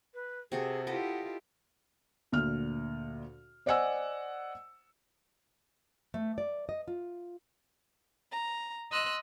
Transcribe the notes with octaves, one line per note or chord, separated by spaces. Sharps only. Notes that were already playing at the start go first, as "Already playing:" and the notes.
B4
C3 F#4 G#4 A4
E4 F4 G4 A4 B4 D#5 F#5
D2 A#2 F6
C5 D5 D#5 F#5 G#5 E6
A3
D5
D#5
F4
A#5
D#5 C6 E6 F#6